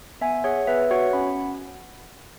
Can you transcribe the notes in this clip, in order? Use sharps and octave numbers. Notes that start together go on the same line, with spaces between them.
B3 E5 G#5
G#4 C#5 F#5
B3 B4 E5
F#4 C#5 F#5
C#4 F#5 B5